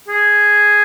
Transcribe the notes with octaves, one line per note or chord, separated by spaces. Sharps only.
G#4